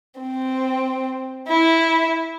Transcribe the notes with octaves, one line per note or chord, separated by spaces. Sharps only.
C4
E4